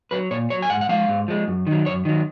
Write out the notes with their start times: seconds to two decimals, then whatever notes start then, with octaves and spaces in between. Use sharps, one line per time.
0.11 F#3 B4
0.31 A#2 C#5
0.50 F#3 C#5
0.62 G#5
0.70 G#2 F#5
0.81 F#5
0.89 F3 G#3 F5
1.08 G#2
1.28 F3 G#3
1.48 F#2
1.67 D#3 F#3
1.86 F#2 C#5
2.05 D#3 F#3